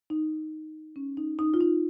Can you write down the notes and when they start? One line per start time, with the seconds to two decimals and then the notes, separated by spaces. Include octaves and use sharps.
0.10 D#4
0.96 C#4
1.17 D#4
1.39 D#4
1.54 F4
1.61 D#4